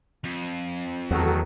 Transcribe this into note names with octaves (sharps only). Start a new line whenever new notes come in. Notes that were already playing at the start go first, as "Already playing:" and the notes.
F2
E2 D#3 F#3 A3 F#4 A4